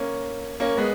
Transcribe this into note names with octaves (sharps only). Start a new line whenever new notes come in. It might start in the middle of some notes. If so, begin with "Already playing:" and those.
Already playing: A#3 C#4
A#3 C#4
G#3 B3